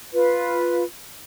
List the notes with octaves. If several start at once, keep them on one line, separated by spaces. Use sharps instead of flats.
F4 B4